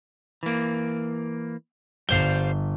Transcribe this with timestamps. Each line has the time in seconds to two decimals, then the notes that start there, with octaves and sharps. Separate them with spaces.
0.43 E3 A#3
2.09 G1 G3 C5 F5 G7